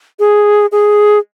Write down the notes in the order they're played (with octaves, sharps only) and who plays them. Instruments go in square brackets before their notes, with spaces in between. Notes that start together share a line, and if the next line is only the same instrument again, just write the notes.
[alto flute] G#4
G#4